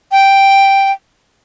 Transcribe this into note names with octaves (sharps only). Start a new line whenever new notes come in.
G5